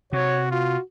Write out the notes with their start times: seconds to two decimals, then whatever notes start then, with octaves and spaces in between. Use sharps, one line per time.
0.13 C3 F#4 C#5
0.51 F4 F#4